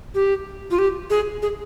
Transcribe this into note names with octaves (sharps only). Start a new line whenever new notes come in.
G4
F4
G4
G#4
G#4